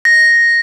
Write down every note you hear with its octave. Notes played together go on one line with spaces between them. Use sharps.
A#6